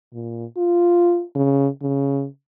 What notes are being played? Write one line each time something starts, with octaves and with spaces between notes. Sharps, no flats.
A#2
F4
C#3
C#3